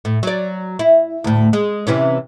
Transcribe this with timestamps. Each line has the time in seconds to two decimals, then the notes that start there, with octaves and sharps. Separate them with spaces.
0.05 A2
0.23 F#3 D5
0.79 E4
1.24 D2 A2
1.53 G#3
1.87 C3 E3 C#4